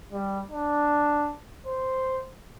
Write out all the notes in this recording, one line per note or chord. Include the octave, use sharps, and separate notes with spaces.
G3
D4
C5